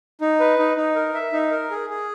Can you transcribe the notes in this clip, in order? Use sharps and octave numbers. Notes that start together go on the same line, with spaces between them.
D#4
B4
D#4
D#4
A#4
E5
D#4
A#4
G#4
G#4